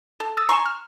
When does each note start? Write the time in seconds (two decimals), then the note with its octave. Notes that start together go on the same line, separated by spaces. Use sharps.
0.20 A4
0.37 D#6 E6 A6
0.49 G#5 A#5 C6 C#6 E7
0.66 F6